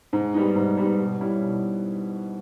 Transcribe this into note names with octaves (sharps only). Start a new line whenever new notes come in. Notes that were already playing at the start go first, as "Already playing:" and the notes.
G#2
G3 B3 D#4
G#2
G3 B3 D#4
B2
G3 C#4 E4
B2